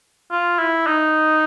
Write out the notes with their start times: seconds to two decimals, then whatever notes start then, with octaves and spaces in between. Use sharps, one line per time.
0.31 F4
0.58 E4
0.87 D#4